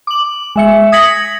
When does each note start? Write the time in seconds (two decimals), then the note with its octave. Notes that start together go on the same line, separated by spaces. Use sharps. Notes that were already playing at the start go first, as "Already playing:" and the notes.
0.07 D6 F#7
0.56 G#3 E5 C#7
0.92 D#6 G#6 A#6 B6 C#7 F#7